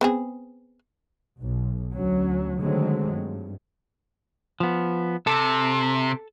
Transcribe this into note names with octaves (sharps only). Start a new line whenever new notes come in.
B3 C4 G#4
B1
D2 F#3 C#4
D3 D#3 F#3 G#3 A3 C4
G2
F3 B3
C3 A4